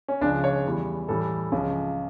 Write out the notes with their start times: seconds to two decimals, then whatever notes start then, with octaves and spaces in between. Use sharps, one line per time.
0.08 C#4
0.21 C#2 C#3 F3 D4
0.44 C#5
0.66 E2 E3 G3
1.09 A2 E3 G3 A4
1.52 C#2 C#3 F3